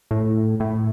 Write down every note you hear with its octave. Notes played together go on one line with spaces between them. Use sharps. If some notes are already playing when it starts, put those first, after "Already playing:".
A2
A2